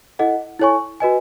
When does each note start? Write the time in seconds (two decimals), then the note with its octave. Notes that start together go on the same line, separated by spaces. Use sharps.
0.19 E4 A4 D#5 F#5
0.60 E4 A4 C#5 G#5 C#6
1.00 F#4 B4 D#5 G#5